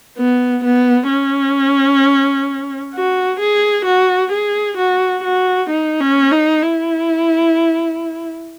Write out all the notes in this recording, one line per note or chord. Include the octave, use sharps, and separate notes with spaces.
B3
B3
C#4
F#4
G#4
F#4
G#4
F#4
F#4
D#4
C#4
D#4
E4